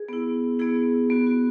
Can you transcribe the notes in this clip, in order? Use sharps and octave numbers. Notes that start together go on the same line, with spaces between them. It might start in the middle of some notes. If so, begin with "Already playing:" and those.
Already playing: G#4
B3 E4
B3 E4 G#4
B3 F#4
F#4